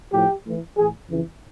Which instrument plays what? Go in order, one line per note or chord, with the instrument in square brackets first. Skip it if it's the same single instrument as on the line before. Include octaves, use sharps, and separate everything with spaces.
[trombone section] A2 F3 G4
A2 E3
A2 E3 G#4
F2 C#3 E3